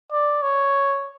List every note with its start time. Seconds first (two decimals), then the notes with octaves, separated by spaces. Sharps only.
0.12 D5
0.43 C#5